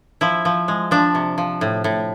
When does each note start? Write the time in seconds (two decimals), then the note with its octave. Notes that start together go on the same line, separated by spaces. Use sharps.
0.21 F3 E4
0.45 F3
0.68 G#3
0.91 F3 D4
1.15 C3
1.38 F3
1.61 A2
1.84 A2